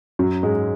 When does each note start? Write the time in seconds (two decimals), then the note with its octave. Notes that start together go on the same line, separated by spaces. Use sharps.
0.19 F#2 F#3
0.43 G#2 G#3